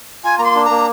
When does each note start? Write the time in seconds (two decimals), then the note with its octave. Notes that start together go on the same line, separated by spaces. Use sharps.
0.24 F4 G#5
0.38 A#3 A#5
0.44 C6
0.55 D4
0.65 A#5
0.70 A#3